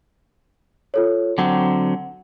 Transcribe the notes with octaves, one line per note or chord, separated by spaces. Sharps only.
F4 A4 C#5
D3 F#3 C4 F#5